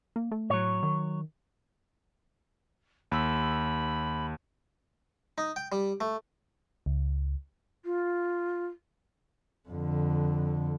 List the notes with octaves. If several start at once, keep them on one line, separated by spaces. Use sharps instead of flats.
A#3
A3
A2 F#3 C#5
D#3
D#2 B5 E6
D#4
G5
G3
A3
C#2
F4
F2 D3